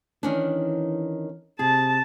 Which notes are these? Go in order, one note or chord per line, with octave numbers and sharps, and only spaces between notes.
D#3 E3 C#4 D4
C3 G#4 A5